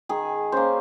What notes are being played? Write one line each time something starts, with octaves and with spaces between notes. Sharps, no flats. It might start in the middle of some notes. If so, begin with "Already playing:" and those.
D#3 G#4
A#3 C#4 C5